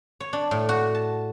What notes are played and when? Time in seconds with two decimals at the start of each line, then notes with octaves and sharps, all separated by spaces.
0.20 C#5
0.33 D4
0.51 A2
0.69 F#4
0.95 A5